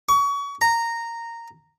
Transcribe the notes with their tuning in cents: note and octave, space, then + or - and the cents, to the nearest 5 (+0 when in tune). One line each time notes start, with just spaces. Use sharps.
C#6 +30
A#5 -10